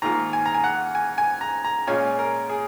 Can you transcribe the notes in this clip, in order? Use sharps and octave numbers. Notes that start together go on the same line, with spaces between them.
G#2 D#3 A#3 F4 A#5
G#5
A#5
G#5
F#5
G#5
G#5
A#5
A#5
A#2 G#3 C#4 F4 G#5
A#4
G#4